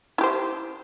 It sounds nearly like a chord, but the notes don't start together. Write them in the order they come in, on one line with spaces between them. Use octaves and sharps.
E4 G4 C5